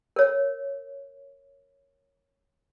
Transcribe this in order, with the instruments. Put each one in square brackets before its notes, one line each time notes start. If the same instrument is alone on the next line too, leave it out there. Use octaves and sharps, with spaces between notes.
[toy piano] A#4 C#5